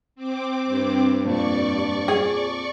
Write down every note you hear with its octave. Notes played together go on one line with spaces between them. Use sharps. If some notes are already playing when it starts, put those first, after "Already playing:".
C4 D6
G2
F2 A#2 D5 C#6
G#4